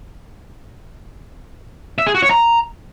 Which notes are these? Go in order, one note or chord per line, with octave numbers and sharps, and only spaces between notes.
E5
G#4
F#4
C#5
A#5